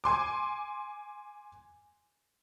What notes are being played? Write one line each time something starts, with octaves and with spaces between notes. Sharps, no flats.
G#5 C6 D6